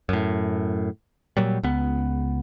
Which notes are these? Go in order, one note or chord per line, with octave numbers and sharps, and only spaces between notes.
F#2 A2
A#2 F#3 G3
C#2 B3